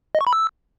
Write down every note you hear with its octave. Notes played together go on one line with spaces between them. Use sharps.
D#5
C#6
B5
E6